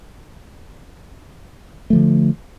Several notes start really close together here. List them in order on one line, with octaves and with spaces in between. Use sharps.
A3 F3 D3